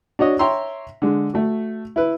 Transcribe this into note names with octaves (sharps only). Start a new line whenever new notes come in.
D4 F#4 C#5 D#5
C#5 E5 G5 A#5 C6
D3 G#3
A3 F#4
E4 B4